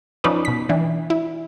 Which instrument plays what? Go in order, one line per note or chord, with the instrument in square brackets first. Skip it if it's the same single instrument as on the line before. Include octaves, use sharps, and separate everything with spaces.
[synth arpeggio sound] F3 C#4 D#4 B4 D5
B2 B6
E3 D4
E4